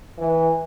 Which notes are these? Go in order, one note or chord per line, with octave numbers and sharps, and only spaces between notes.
E3